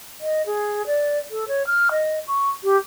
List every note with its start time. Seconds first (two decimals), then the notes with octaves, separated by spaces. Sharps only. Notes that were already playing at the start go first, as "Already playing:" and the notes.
0.20 D#5
0.46 G#4
0.87 D5
1.31 A4
1.48 C#5
1.67 F6
1.91 D#5
2.28 C#6
2.64 G4